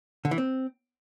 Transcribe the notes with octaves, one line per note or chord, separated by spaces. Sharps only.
D3
E3
C4